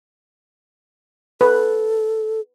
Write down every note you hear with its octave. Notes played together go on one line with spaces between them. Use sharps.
A4 B4